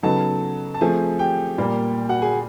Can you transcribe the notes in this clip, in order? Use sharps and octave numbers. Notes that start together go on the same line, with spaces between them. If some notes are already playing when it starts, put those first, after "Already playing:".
C#3 F#3 B3 D#4 A4 A5
A5
F3 A3 C4 G#4 G#5
G4 G5
A#2 G3 A#3
F#4 F#5
G#4 G#5